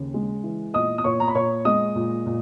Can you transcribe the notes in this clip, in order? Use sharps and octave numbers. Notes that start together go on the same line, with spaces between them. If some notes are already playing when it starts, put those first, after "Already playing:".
Already playing: D#2 C#3
G#3
E3
A#2 D#5 D#6
D#6
A#2 C#5 C#6
A#5
B5
A#2 C#5 C#6
G#3 D#5 D#6
A#2
A#2